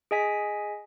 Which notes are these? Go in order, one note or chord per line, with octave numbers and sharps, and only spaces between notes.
G#4 D#5 G#5 B6